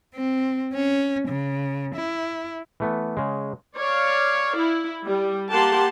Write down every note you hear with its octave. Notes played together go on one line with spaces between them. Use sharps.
C4
C#4
C#3
E4
E3 A3 B3
C#3 G#3
C#5 D5 F5
E4
G3
A#3 G4 F#5 A5 C6